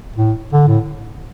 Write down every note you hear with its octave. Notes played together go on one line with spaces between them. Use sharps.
A2
D3
A2